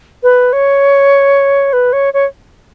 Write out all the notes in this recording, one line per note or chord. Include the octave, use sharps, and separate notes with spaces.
B4
C#5
B4
C#5
C#5